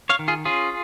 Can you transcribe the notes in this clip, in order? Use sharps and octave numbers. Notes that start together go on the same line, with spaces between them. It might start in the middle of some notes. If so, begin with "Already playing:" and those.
C#5 F5
D#3
F4 G#4
C#4 F4 G#4